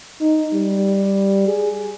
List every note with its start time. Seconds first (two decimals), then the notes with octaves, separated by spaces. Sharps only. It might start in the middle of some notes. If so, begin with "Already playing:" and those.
0.21 D#4
0.53 G3
1.47 G#4